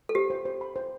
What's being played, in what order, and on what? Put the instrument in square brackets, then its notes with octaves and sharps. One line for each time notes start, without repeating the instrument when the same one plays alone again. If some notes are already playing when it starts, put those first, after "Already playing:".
[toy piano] A4
[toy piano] G4 [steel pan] C5
[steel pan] C5
C5
B5
C5